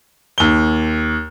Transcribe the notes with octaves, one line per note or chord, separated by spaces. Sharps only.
D#2 G7